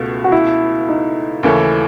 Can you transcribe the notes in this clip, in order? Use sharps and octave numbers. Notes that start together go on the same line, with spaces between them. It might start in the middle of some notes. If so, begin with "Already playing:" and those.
Already playing: C#2 B2 A3 F#4
F#4
E4
D#4
D#2 C#3 E3 A3 C#4